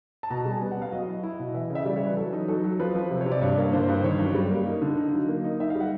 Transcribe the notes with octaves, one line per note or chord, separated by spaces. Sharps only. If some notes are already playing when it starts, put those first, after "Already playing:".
A5
B2 A#5
A5
G3
G#5
B3
F#5
B3 F5
F#3 D#5
E4
E4
B2
E3 E5
C#3
E5
G3 D5
C#5
E3 B4
F#3 A4
D#4
F#3 A4
F#3
F3 B4
F3
C3
C#5
C3
D5
G2 C#5
A#3
D3 C5
C5
G2
C5
D#3 C#5
F#2
G3
A#3
D#4
D3
D#4
F#3
A#3
D#4
D#4 E5
F5
G3
F#5